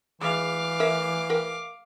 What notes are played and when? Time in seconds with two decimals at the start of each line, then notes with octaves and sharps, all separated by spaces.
0.21 E3 G#3 F5 D6
0.80 A#4 C#5 E5
1.30 A#4 E5 G5